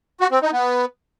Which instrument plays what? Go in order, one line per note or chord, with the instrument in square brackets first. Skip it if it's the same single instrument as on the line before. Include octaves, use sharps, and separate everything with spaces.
[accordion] F#4
C4
D#4
B3